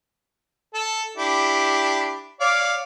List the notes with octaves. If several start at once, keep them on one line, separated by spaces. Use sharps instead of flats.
A4
D4 E4 G4
C#5 D5 F5